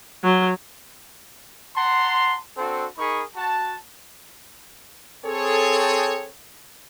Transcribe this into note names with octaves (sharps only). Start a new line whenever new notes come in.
F#3
F#5 A5 A#5 C6
C4 D4 F#4 A4 C5
D#4 G#4 A#4 B5 C#6
F#4 A5
C4 G#4 A4 C#5